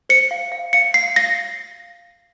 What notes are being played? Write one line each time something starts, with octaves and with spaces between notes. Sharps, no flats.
C5 C#7
F5
F5
F5 C#7
F5 C7
F5 A#6